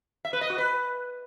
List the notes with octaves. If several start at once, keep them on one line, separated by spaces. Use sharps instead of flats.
E5
B4
D#5
F#4
B4